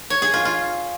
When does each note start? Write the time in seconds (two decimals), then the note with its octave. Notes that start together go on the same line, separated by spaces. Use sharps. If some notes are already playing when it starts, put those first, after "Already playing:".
0.10 C#5
0.22 G#4
0.34 F4
0.45 F4